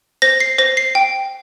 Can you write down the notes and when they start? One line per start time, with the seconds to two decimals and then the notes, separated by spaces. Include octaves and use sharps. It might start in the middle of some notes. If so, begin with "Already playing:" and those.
0.22 C5 A#6
0.40 C7
0.58 C5 A#6
0.77 C7
0.95 G5